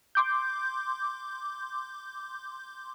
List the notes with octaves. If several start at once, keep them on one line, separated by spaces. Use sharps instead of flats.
C6 D6 G6